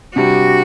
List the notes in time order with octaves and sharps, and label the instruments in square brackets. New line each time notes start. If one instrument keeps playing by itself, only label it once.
[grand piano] C3 G3 D4 G4 [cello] F#4